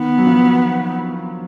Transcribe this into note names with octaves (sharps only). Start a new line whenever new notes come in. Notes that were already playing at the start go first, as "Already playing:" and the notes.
Already playing: D#3 B3
F#3
F3